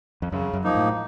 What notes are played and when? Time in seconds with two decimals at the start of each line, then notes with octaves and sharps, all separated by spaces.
0.22 F2
0.32 F#2 C#3
0.53 F#2
0.64 F3 A#3 D#4
0.75 A2